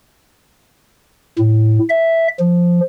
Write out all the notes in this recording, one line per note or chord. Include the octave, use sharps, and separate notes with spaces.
A2
E5
F3